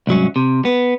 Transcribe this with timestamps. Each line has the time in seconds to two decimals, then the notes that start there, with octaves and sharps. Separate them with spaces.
0.07 C2 G#2 F#3 C#4
0.36 C3
0.65 B3